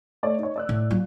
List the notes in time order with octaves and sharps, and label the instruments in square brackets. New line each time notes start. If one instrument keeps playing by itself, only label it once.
[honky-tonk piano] A3 C#5 D5
D#4 C#5
D5 E6 F#6
[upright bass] A2
[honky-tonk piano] A#2 [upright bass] F#3